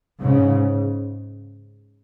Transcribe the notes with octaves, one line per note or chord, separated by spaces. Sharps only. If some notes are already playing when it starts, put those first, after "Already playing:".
G#2 C#3